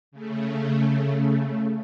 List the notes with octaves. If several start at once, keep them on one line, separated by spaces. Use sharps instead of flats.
C#3 A3